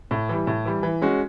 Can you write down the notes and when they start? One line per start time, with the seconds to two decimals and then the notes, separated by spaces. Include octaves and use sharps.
0.11 A2
0.29 E3 G3
0.47 A2
0.65 E3 G3
0.83 E3
1.02 G#3 C#4 F#4